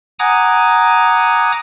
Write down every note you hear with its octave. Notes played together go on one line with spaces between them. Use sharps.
F#5 G#5 A#5 D6 D#6